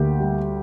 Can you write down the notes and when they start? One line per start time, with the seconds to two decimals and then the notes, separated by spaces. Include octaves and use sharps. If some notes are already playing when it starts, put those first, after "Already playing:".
Already playing: D2 A#3 G4
0.20 G3